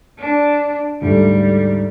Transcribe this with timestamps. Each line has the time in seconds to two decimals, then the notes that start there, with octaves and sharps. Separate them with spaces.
0.18 D4
1.02 D2 G#2 G3 A3